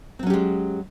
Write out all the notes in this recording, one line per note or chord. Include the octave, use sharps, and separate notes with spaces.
F#3 G#3 C4 C#4 G4